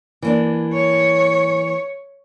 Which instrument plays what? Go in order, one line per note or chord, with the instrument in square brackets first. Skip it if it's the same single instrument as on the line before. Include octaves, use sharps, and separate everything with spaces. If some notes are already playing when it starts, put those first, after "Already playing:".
[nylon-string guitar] E3 A#3 D4
[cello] C#5